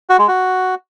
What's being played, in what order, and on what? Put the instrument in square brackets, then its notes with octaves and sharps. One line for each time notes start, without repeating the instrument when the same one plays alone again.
[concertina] F#4
G#3
F#4